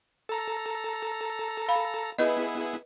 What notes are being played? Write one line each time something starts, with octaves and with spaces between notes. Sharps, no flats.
A4 A#5
F5 B5
B3 E4 G#4 B4 D#5